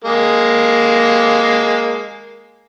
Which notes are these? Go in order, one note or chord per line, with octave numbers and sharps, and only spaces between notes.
G#3 A#3